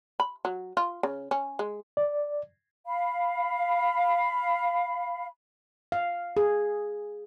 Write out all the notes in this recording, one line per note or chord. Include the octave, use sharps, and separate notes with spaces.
B5
F#3
F4
C#3
C#4
G#3
D5
F5 B5
F5
G#4